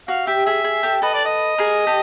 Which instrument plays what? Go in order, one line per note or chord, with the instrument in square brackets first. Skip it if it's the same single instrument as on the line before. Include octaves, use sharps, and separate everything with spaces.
[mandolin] F#4 [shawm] F5
[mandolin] G4 [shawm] E5
[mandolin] G#4 [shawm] E5
[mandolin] G#4
G4 A4
[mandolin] A4 B4 [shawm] D#5
[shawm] D5
D#5
[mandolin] G#4 A#4
G4 A4